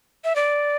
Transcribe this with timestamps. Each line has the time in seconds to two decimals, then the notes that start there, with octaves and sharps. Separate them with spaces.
0.24 E5
0.36 D5